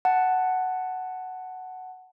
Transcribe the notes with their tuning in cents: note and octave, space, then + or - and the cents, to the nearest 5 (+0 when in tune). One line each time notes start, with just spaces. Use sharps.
F#5 +0 A5 +0